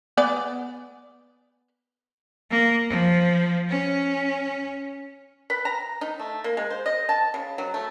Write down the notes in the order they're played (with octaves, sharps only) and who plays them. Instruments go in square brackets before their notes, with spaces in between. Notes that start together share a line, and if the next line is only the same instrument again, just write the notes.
[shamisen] B3 D5 G#5
[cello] A#3
F3
C#4
[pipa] B4
A#5
D#4
A3
A#3
G#3
C5
D#5
A5
C#3
F#3
A3